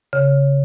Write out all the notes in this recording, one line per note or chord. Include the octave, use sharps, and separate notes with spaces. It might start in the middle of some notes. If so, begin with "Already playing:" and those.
C#3